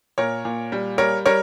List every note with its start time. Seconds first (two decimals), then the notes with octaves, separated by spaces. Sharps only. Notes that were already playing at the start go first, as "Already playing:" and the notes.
0.18 A#2 A#4 C#5
0.45 A#2
0.72 G3
0.98 G3 A#4 C#5
1.26 G3 A#4 C#5